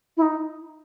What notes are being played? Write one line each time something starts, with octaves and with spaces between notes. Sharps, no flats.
E4
D#4